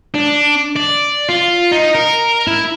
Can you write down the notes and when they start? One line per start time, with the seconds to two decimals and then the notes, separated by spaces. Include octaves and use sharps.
0.14 D4
0.76 D5
1.29 F4
1.72 D#4
1.95 A#4
2.47 E4